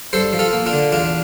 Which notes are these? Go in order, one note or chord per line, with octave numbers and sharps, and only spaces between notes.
G2 A4 C5
F3
F4 A4
A#3
D4 F4
D3
E2 D4 F4